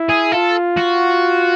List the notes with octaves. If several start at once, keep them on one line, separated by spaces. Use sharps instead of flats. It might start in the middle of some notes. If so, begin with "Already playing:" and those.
Already playing: E4
G#4
F4 A4
F#4